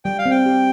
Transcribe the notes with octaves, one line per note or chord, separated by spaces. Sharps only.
G3 G5
F5
C4 G5
G4